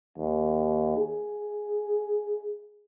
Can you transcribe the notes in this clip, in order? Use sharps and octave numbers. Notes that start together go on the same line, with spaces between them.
D#2
G#4